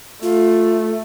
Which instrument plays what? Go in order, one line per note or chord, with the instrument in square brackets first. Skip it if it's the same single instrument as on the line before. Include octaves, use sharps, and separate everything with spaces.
[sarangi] A3 [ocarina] F4